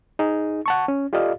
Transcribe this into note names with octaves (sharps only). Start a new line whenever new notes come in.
D#4 G#4
F#5 A5 C#6
C#4
F4 G4 A4 D5 D#5 F5